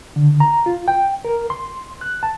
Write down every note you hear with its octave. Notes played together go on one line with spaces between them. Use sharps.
D3
A#5
F4
G5
A#4
C6
F#6
A5